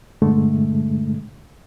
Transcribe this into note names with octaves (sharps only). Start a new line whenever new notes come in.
G2 A#2 D3 G#3 A3